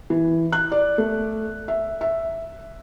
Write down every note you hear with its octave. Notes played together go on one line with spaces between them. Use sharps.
E3
F#6
D5
A3
E5
E5